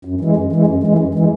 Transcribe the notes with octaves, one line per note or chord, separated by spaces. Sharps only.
F#2
E3 G#3
F#2
E3 G#3
F#2
E3 G#3
F#2
E3 G#3